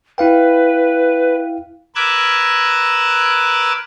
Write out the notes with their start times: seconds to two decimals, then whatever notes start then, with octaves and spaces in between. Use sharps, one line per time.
0.18 E4 B4 F5 G5
1.95 A#4 B4 D6 E6 F#6 G#6